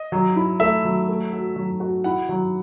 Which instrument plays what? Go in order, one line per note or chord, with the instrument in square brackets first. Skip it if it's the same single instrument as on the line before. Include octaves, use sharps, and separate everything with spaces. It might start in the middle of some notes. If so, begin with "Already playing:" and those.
Already playing: [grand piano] D#5
[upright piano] F#3
E4
[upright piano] A3 [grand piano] E5
[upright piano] F#3
A3
F#4
F#3
F#4
[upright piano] E4 [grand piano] F#5
[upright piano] F#3